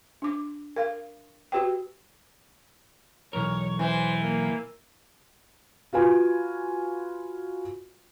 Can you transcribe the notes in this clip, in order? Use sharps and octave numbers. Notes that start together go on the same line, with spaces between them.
D4 D6
A#4 F5
F#4 G4 B4 G5
B1 E2 A#4 C#5
E3 C5
A#3
F4 F#4 B4 G#5